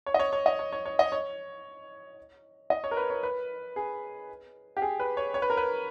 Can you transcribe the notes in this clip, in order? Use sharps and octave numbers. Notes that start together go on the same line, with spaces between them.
C#5
D#5
C#5
C#5
D#5
C#5
C#5
C#5
D#5
C#5
D#5
C#5
A#4
B4
C#5
B4
G#4
G4
G#4
B4
C#5
C#5
B4
A#4
B4